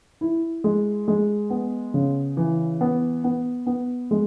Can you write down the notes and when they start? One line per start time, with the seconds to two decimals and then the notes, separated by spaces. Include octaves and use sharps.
0.21 E4
0.64 G#3
1.08 G#3
1.50 B3
1.94 C#3
2.37 E3
2.81 B3
3.24 B3
3.67 B3
4.11 G#3